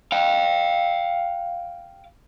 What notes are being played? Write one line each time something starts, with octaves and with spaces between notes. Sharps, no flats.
F5 G5